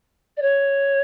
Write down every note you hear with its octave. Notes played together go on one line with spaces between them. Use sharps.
D5
C#5